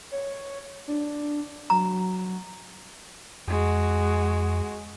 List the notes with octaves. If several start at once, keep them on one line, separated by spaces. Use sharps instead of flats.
C#5
D4
F#3 A#5
F2 G#3 F#4